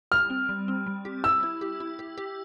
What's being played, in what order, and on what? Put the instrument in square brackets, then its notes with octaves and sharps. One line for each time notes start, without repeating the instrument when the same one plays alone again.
[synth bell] G3 [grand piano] F6
[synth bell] C4
G3
C4
G3
G4
[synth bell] E4 [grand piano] E6
[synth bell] E4
G4
E4
G4
G4